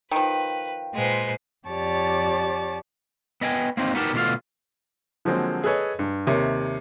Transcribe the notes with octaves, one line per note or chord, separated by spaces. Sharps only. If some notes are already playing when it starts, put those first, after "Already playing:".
D#3 F3 B4 G5
A#2 G#3 B4 C5
F2 G4 C#5 D5 A5 A6
B3 D#5 G5 G#5
A#3 C4 D#4
B3 D#4 F#4 G4 A#4 A5
B2 D3 E3 A3 F4 F5
D3 F3 F#3 G#3 A#3 C4
G#4 A4 B4 C#5 D#5
G2
D#2 C3 A#4 C#5 E5